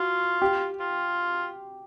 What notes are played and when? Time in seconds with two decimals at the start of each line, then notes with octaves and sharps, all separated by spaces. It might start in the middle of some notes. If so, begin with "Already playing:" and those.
Already playing: F4 F#4
0.42 G4
0.80 F4